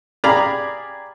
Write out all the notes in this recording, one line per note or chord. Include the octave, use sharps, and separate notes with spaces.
G4 G#4 D5 F5 A#5 B5